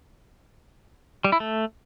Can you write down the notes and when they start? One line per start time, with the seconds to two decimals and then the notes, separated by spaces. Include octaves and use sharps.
1.24 G3
1.32 E4
1.40 A3